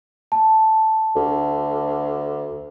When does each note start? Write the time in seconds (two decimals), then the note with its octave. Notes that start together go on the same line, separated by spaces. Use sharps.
0.32 A5
1.15 D2